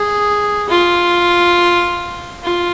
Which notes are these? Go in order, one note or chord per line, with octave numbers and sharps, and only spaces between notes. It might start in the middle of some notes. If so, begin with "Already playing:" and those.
Already playing: G#4
F4
F4